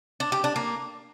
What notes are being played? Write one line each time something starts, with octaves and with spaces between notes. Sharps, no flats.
D4
G4
D4
A#3